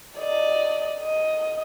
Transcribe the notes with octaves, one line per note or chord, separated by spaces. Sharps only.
D5 D#5
D#5